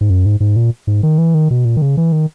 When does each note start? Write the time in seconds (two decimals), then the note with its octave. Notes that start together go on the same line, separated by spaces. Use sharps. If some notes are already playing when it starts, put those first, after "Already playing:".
0.01 G#2
0.10 F#2
0.26 G#2
0.40 G#2
0.56 A#2
0.87 G#2
1.03 D#3
1.18 E3
1.34 D#3
1.51 B2
1.65 A#2
1.77 D#3
1.82 C#3
1.97 E3
2.12 D#3